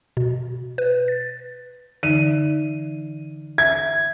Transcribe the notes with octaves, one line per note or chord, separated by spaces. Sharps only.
B2
B4
A6
D3 E3 D#4 D#7
E5 G#6